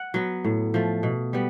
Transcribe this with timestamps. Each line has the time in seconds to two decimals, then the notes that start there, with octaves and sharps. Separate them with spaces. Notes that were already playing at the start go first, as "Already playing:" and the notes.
Already playing: F#5
0.14 F#3 B3
0.44 A2
0.74 F3 A3
1.03 B2
1.33 G3 B3